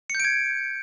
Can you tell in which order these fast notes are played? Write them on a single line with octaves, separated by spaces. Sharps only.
C#7 G6 D7 G#6